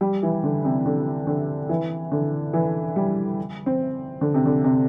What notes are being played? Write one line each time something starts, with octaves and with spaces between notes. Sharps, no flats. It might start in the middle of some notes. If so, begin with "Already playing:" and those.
G3
E3
D3
C3
D3
D3
E3
D3
E3
G3
C4
D3
C3
D3
C3